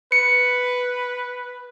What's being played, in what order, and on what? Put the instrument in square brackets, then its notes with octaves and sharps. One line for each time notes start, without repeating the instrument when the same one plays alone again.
[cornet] B4 [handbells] C#7